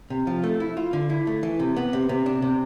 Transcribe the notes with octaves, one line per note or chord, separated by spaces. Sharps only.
C3
F3
A3
E4
F4
D3
E4
A3
E3
C3
B3
C3
C3
D4
C3